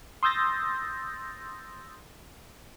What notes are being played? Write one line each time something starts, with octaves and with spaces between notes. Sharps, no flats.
C6 D#6 E6 G6 A6 A#6